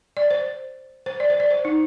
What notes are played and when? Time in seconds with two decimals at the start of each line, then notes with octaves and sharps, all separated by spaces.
0.17 D5
0.31 C5
1.06 C5
1.20 D5
1.30 C5
1.40 D5
1.50 C5
1.65 D#4